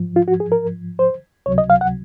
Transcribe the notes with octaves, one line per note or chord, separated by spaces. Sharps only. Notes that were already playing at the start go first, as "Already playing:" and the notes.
Already playing: G#2 F3
F4
F#4
G#4
A#4
C5
C#2 C3 F#3 C#5
D#5
F5
F#5